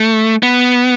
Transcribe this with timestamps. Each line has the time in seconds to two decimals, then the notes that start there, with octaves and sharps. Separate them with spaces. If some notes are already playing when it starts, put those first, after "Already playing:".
Already playing: A3
0.43 B3